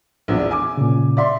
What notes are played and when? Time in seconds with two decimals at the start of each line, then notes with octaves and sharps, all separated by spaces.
0.28 A#1 E2 D4
0.51 G#5 D6
0.77 A#2 C#3
1.17 D5 E5 C6